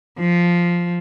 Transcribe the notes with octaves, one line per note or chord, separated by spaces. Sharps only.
F3